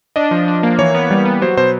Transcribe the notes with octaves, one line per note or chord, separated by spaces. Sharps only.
D4 D#5
F3
D4
A#3
E3 C#5
B3
G3
B3
F#3 C5
B2 C5